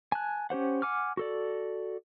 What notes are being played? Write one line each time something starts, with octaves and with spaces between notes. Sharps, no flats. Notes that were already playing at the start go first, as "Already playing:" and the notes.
G#5 A5 F#6
C#4 G4 C5 F#5
F#5 G#5 D6 F6
F#4 A4 D5